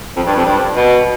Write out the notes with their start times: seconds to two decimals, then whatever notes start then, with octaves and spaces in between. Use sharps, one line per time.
0.16 F2
0.27 G2
0.36 F2
0.46 G2
0.76 B2